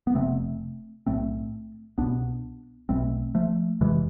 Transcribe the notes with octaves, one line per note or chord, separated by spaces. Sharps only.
B3
F1 F2 C3 A3 C4
B1 A2 A3 C4
C2 B2 B3 D4
B1 B2 A3 C4
F3 A3
F1 F2 C3 E3 G#3